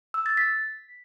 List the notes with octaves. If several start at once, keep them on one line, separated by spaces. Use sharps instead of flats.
E6
A6
B6